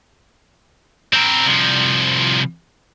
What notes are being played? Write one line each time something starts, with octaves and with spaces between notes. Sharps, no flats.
C4 A#4
C2 F3